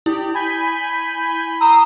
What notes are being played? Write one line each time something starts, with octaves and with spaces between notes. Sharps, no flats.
E4 G4
G#5 B5 G6
A#5 C6 D#6 E6